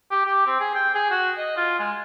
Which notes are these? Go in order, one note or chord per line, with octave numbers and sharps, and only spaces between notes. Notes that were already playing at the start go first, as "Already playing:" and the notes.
G4
G4
C4
G#4
G5
G#4
F#4
D#5
F4
G#3